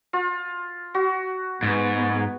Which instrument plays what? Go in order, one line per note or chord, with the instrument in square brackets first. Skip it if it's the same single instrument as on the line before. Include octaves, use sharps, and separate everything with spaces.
[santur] F4
F#4
[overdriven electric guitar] G#2 [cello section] G#3 B3